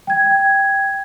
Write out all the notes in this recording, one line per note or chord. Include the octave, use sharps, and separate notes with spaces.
G5 G#6